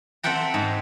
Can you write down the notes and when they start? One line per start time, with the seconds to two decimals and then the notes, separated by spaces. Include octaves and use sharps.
0.23 C4 A4 E5 F#5 G5 A#5
0.54 G#2